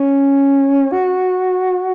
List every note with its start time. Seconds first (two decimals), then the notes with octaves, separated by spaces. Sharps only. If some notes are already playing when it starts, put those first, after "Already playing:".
Already playing: C#4
0.92 F#4